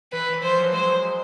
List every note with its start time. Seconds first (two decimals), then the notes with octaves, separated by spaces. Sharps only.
0.12 E3 B4
0.30 E3
0.43 F3 C5
0.57 E3 F#3
0.73 F#3 G#3 C5